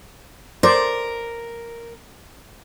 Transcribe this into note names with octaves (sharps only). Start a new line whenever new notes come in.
A#4 C5 D5